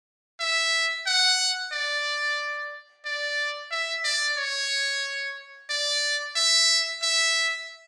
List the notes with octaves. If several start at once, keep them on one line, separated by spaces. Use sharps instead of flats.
E5
F#5
D5
D5
E5
D5
C#5
D5
E5
E5